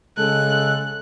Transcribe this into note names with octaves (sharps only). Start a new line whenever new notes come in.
C#3 G#3 A4 F#6